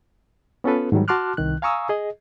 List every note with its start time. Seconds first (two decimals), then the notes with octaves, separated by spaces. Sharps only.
0.64 B3 C#4 F4 A4 B4
0.92 G#2 D#3 F#3 G3
1.08 F#4 A5 C6 D6 F6 F#6
1.37 C2 D#3 F#6
1.62 F5 G#5 A#5 C#6 D#6 E6
1.89 G#4 D#5